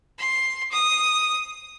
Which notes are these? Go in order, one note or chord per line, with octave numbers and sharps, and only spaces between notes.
C6
D#6